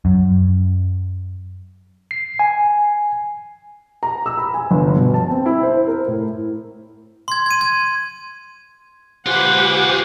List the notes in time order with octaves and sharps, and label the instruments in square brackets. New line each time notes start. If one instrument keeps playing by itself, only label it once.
[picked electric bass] F#2
[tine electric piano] C7
G#5
[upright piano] A#5
E6
B5
G#5
G1
B2
A5
C4
E4
C5
A#4
A2
[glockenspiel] C6 G#6
G#6 D#7
G#6
[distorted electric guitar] F4 B4 [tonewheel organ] G4 C5 G#5 [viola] F#5